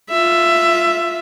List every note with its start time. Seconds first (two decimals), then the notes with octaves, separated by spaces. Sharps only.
0.10 F4 E5